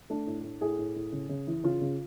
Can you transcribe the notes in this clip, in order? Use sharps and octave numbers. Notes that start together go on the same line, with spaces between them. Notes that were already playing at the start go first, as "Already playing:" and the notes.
A3 D4
A2
A2
A2 G#4
A2
A2
C#3
C#3
E3
C#3 F4
C#3